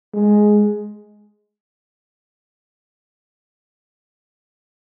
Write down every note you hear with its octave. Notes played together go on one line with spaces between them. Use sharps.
G#3